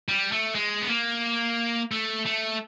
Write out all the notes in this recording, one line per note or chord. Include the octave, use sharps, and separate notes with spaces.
G3
A3
G#3
B3
A#3
A3
A3